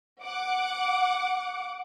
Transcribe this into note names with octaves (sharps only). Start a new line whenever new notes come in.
F#5 D6